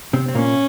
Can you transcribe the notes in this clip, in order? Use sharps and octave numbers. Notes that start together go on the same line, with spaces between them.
C3 C4
C4
A#2 A#3 C#4